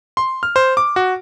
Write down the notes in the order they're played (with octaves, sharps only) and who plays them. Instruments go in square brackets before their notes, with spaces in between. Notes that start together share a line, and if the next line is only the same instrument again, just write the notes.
[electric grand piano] C6
F6
C5
D6
F#4